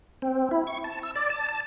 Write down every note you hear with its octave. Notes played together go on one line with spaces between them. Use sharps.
C4
E4
C#6
A5
E6
D5
A5
A5